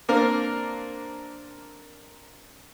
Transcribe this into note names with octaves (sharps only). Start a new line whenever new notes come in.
A#3 C4 D4 A#4 F5